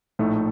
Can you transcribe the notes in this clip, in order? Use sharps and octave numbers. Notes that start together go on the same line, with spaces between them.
A#1 A2 A3 D#4 A4